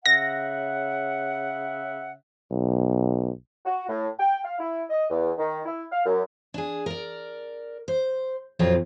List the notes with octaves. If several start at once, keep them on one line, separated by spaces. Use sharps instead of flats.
C#3 E5 F#5 A#6
B1
F#4
A2
G5
F5
E4
D#5
E2
D#3
E4
F5
F#2
D4 G#4
A#4 D5
C5
F2 A#2 F#3 C4 F4